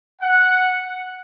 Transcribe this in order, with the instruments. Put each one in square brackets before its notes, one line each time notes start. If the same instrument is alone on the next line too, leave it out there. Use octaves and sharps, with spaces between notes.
[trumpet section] F#5